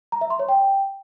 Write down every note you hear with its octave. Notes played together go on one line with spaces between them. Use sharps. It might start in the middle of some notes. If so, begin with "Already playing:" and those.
A#5
E5
C6
C#5
G5